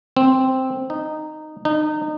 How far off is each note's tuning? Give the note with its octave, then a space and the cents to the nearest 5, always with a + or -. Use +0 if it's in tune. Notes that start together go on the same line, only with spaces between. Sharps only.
C4 +0
D#4 -15
D#4 -30